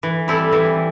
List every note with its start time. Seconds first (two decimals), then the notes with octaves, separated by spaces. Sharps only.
0.03 E3
0.28 G3 C4 E4 A4
0.52 E3